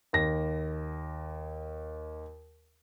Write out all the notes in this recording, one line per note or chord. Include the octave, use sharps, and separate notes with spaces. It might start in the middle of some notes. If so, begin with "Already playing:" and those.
D#2 A#6